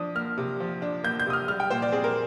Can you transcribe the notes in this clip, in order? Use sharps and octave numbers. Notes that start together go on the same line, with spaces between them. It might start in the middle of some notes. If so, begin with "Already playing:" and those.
Already playing: F3 D4 D#6
A#3 F6
C3
F3
D4
A#3 G6
G6
C3 D#6
F6
G3 F6
G5
A#2 C5
D5
C4 G#4
A#4